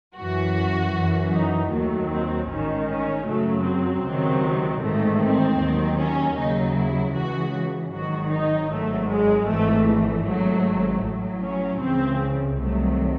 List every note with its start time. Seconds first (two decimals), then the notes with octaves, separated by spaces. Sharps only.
0.17 F#2 E3 F#4
0.94 F#2 E3
1.33 D#4
1.72 D#2 D#3 F#3 A3
2.11 C4
2.49 A1 G#2 D#3 C#4
2.88 C#4
3.27 F#2 C#3 F#3 A3
3.65 C4
4.05 C#2 C3 D#3 F#3
4.83 A1 G#2 D#3 A3
5.21 C4
5.60 D#2 D#3 F#3
5.98 C#4
6.37 D#2 C#3 F#3 D#4
6.77 E4
7.15 C#2 C#3 E3 F#4
7.93 G#1 G#2 D#3 F#3 F#4
8.32 D#4
8.70 G#1 G#2 F#3 A3
9.09 G#3
9.48 G#1 G#2 E3 A3
9.88 A3
10.26 G#1 G#2 F#3
11.03 A1 A2 F#3
11.42 C#4
11.81 C#2 C#3 E3 C4
12.59 C2 C3 D#3 F#3 A3